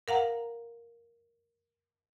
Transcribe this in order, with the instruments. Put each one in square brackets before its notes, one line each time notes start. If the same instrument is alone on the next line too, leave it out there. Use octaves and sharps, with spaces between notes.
[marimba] A#4 F5 F#5 A#5